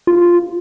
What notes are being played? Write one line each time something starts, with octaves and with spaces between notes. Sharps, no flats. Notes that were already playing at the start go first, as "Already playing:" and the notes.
F4